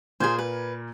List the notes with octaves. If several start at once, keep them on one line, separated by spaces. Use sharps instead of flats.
A#2 A#3 G#4 C5 G#6
B4